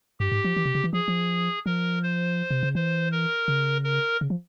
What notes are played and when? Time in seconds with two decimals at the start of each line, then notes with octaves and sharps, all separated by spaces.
0.20 G2 G4
0.32 G#2
0.44 F3
0.57 E3
0.66 C3
0.75 C#3
0.84 E3
0.93 F3 G#4
1.08 F3
1.66 F3 A#4
2.03 C5
2.51 C3
2.63 C#3
2.75 E3 C5
3.12 A#4
3.48 C#3
3.84 A#4
4.21 C#3
4.30 F3